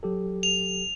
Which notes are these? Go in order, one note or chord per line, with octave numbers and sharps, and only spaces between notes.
F#3 G4 A4
F7